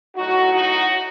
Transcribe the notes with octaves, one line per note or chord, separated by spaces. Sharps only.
A2 F#3 D#4 F#4
D#4 F#4